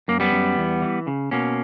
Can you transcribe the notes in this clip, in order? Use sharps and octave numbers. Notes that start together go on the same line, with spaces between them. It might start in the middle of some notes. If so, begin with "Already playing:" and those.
F#2 A#3
G3 B3
F#2
E2
E3
C#3
B2 A#3 C#4